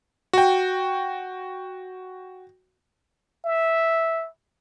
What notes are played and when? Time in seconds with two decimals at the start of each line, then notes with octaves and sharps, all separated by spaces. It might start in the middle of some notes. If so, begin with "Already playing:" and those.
0.33 F#4 G5
3.45 E5